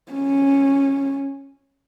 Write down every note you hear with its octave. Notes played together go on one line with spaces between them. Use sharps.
C#4